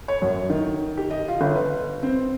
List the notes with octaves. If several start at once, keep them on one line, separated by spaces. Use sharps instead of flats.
C#5
F#2
D#3
G4
D#5
F4
G1
B4
C4